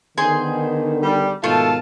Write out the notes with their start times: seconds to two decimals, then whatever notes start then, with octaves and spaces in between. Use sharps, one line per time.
0.18 D3 D#3 B3 G#4 C5 C6
1.03 G3
1.44 G#2 B2 D#3 A3 F4 A5